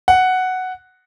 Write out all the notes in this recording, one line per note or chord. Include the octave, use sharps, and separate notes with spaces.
F#5